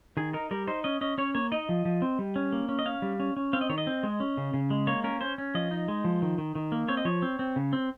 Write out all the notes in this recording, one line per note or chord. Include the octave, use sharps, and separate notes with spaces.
D#3 G#4
D#4 A#4
G3 A#4
D#4 C5
C#4 D#5
C#4 D#5
C#4 C#5
A#3 C#5
D#4 D#5
F3
F3
C4
G3
C#4
A#3
C#4
D#5
C#4 F5
G3
C#4
C#4
C4 F5
D#5
D#3 C#5
D#5
C4
G#3
C#4
C#3
C#3
G#3
A#3 C#5
C#4 A#4
C#4 C5
C#4
F3 D#5
D#4
G#3
F3
D#3
D#3
D#3
A#3
C4 C#5
D#5
F3 C#5
C4
C4
C#3
C4